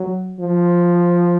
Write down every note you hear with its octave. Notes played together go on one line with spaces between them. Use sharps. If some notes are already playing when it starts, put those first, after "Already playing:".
Already playing: F#3
F3